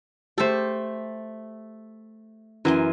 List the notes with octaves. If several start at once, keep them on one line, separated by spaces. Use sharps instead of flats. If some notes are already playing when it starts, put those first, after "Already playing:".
A3 G4 A4 C5
F#2 E3 A#4 G#5 C6